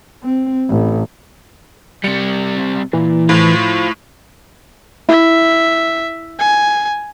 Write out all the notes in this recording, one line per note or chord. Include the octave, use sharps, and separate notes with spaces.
C4
A1
C3 G3 C#7
A#2 E3
A2 F4 C5
E4 E5
G#5